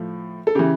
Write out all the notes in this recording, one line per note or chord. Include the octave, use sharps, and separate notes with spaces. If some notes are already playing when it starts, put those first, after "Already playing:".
Already playing: A2 F3
A4
C#3 E3 G4